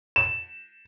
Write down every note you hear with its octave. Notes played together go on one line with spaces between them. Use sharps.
E7